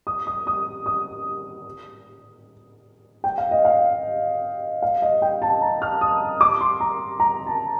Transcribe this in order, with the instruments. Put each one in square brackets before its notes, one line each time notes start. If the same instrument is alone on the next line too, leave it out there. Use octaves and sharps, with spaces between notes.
[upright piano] D#6
D#6
D#6
D#6
G5
F5
D#5
F5
F5
D#5
G5
A5
A#5
F6
D#6
D6
C6
A#5
A#5
A5